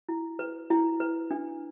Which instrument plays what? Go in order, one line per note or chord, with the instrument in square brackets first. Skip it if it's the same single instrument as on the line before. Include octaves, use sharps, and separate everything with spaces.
[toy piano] E4
B4
E4
B4
D4